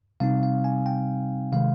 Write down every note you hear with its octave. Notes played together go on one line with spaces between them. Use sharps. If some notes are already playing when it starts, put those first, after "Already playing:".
C3 G3 C4 D#4 F5
F5
G#5
G5
C3 D#3 G#3 F5